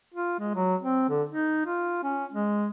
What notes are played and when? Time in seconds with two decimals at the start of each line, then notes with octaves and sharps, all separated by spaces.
0.14 F4
0.39 G#3
0.55 F#3
0.80 C4
1.09 D3
1.29 D#4
1.66 F4
2.03 C#4
2.32 G#3